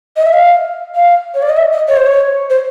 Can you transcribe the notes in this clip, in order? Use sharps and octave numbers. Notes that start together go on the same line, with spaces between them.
D#5
E5
F5
F5
C#5
D5
D#5
E5
D#5
C#5
C5
C#5
C5